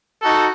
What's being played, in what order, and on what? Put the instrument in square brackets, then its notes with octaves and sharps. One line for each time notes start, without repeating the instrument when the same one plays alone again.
[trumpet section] D#4 F#4 A4